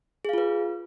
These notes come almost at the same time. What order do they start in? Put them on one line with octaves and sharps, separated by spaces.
G#4 F5 F4 B4